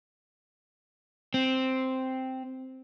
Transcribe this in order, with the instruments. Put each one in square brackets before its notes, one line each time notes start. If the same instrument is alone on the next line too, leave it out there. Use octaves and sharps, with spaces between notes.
[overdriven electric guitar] C4